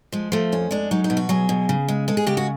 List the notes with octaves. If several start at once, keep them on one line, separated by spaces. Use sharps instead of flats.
F3 G#3
F3 A3
F2 C#4
G#3 D4
F#3 D#4
D#4
B2
F#4
F#3 G#4
B2
C#3
G#3
G#3 A4
G#4
C#3 G4
F#4